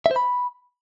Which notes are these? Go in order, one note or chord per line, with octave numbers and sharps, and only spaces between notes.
E5
C5
B5